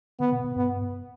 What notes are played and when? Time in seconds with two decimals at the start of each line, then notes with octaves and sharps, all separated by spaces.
0.20 D3 B3
0.32 B2
0.44 B2
0.56 G2 B3